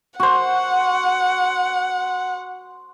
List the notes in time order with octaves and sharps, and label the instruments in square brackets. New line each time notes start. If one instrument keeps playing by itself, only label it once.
[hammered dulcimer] F#4 C5 [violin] F#5